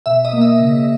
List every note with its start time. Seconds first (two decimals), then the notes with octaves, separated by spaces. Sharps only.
0.06 B2 E5
0.25 D#5
0.33 A#3
0.41 E5
0.60 C#3